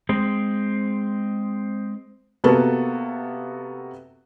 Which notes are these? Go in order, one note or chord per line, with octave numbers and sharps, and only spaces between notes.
G#3 C4
C3 A#3 B3 F#4 A4